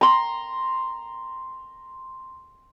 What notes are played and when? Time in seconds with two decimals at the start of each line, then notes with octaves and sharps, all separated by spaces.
0.01 A#5 C6